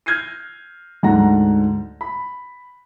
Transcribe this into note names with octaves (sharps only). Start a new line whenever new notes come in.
F6 G6 G#6 A#6 C7 D#7
D2 G#2 D4 F#5 A#5 A#6
B5